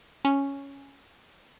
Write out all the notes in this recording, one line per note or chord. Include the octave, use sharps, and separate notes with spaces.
C#4